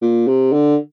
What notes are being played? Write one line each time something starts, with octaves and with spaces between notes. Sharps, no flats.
A#2
C3
D3